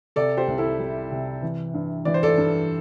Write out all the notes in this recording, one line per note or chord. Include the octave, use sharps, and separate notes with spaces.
C3 A4 D5
G4 C5
C2
E4 A4
G3
C3
E3
G2
E3 D5
C5
A4 D5
G2